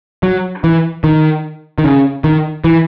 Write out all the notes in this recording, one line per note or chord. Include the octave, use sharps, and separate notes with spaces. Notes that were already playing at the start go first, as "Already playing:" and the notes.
F#3
E3
D#3
D#3
C#3
D#3
E3